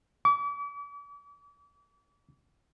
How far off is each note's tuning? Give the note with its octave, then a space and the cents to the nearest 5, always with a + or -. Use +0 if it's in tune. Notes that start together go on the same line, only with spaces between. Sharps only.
D6 -40